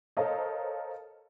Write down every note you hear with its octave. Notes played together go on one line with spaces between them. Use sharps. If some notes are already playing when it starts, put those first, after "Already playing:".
A4 A#4 C5 C#5 D#5 F5